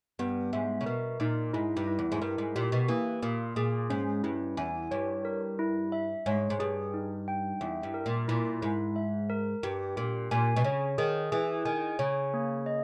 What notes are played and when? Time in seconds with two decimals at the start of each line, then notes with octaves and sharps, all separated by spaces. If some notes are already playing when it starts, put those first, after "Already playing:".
0.19 G2 B3
0.53 G#2 E5
0.81 C#3
0.86 B2 A#4
1.20 A#2 D#4
1.53 G#2 E4
1.77 G2
1.87 E4
1.99 E2
2.12 G#2
2.22 G2 A#4
2.38 G#2
2.55 A#2 G4
2.72 B2
2.88 E3 A#3
3.22 A#2 A#3
3.56 A#2 G#4
3.90 G#2 C#4
4.23 G2 E4
4.57 E2 G#5
4.91 G2 C#5
5.25 A#4
5.59 E4
5.92 E5
6.26 G#2 C#5
6.50 G#2
6.60 G2 G#4
6.94 D#4
7.28 G5
7.61 E2 E5
7.83 G2
7.94 A#4
8.06 A#2
8.28 A#2 E4
8.62 G#2 E4
8.96 E5
9.30 A#4
9.63 G2 G4
9.96 A#2 G4
10.31 A#2 G#5
10.56 B2
10.64 C#3 C#5
10.98 D#3 G#4
11.32 E3 G#4
11.65 D#3 G#5
11.99 C#3 C#5
12.34 A#3
12.66 D#5